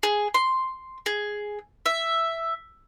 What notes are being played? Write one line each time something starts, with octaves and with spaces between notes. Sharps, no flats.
G#4
C6
G#4
E5